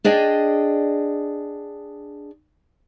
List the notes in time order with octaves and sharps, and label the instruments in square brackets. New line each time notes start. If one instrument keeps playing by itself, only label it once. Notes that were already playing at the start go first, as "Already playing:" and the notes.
[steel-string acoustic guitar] D4 G#4 D5 D#5 G5